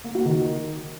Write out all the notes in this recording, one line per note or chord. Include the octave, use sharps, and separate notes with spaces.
A#3
F#4
D#3